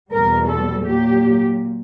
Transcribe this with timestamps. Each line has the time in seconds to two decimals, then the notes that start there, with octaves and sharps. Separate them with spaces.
0.11 E2 B2 G3 A#4
0.48 A4
0.85 A#2 F#3 G4